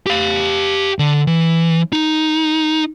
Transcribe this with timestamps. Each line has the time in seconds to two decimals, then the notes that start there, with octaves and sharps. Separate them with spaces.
0.06 G4 F5
0.99 D3
1.27 E3
1.93 D#4